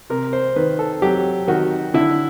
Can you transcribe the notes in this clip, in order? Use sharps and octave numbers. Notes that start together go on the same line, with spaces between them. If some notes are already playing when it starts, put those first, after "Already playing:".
C3 A#4
C5
D#3 B4
A4
F#3 G4
D#3 F#4
D3 E4